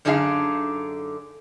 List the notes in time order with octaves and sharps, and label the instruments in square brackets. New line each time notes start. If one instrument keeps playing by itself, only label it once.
[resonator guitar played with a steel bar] F#2 D3 D4 D#4 G#4 F5